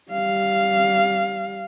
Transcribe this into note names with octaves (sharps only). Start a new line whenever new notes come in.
G3 F5